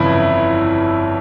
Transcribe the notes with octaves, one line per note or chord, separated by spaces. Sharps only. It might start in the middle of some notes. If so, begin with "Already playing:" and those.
Already playing: G1 F2 C#3 E3 E4